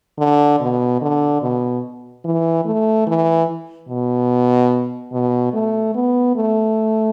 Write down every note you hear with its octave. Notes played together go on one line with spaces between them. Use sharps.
D3
B2
D3
B2
E3
A3
E3
B2
B2
A3
B3
A3